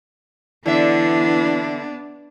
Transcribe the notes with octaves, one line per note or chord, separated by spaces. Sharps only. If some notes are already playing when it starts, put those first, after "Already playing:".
D3 E3 B3 D4 E5